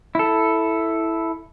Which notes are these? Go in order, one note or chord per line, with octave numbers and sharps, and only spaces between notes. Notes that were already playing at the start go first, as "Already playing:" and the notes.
E4 A4